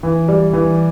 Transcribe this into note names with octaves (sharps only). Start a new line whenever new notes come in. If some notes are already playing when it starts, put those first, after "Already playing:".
E3
G3
E3